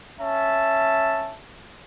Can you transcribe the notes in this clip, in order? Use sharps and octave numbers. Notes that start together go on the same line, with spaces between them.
C#4 E5 A5